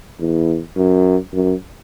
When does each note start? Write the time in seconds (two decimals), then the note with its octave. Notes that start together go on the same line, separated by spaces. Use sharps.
0.20 E2
0.77 F#2
1.34 F#2